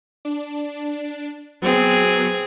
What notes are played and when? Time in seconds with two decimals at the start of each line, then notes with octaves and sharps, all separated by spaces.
0.25 D4
1.62 F#3 B3 C4 G#4